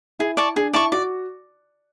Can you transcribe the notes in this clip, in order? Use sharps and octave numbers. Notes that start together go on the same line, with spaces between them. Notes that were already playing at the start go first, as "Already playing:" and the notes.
E4 G#4
D5 A5 C#6
D4 G#4
E4 D5 A5 C#6
F#4 D5